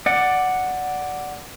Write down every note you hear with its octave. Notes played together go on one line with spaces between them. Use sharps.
D5 F#5